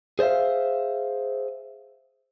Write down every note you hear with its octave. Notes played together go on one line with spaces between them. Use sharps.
G#4 C5 D5 E5 F5